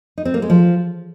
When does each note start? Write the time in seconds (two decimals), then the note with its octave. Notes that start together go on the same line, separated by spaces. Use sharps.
0.18 D#4
0.25 C4
0.34 A#3
0.42 G#3
0.50 F3